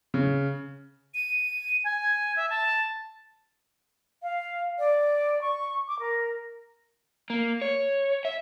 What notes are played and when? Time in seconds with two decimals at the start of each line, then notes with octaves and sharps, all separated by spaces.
0.14 C#3
1.14 D#7
1.84 G#5
2.36 E5
2.50 A5
4.22 F5
4.79 D5
5.42 C#6
5.88 D6
5.99 A#4
7.30 A#3
7.61 C#5
8.25 E5